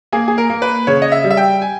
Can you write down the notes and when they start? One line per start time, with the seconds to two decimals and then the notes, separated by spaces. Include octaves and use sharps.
0.12 A#3 G#4
0.28 G#4
0.38 A#4
0.50 A#3
0.62 B4
0.87 C#3 C#5
1.02 D#5
1.12 E5
1.24 G3
1.31 E5
1.37 G5
1.62 G#5